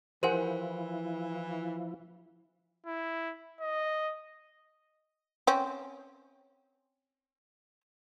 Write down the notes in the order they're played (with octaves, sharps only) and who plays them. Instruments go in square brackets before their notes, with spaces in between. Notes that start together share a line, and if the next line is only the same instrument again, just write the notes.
[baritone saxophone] E3 [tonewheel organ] F3 E4 [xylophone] G4 A#4 G#5 [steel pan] C5 F#5
[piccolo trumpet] E4
D#5
[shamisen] C4 C#4